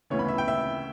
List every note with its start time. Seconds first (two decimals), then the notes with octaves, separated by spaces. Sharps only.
0.10 D2 C#3 E3 B3 C#5
0.19 B5
0.28 E5
0.38 G5
0.48 E5